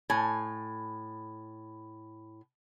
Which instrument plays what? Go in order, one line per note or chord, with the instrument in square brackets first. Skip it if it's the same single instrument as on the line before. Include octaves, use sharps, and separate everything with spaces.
[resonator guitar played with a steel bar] A2 G#5